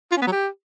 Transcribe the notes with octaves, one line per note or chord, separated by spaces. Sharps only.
F4
C#4
B3
F#3
G4